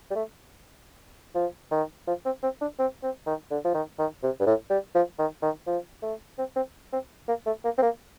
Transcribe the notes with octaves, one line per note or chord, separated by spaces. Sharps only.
G3
A3
F3
D#3
F3
C4
C4
D4
C4
C4
D#3
D3
F3
D#3
D#3
C3
G2
A2
G3
F3
D#3
D#3
F3
A3
C4
C4
C4
A#3
A3
A#3
C4
A#3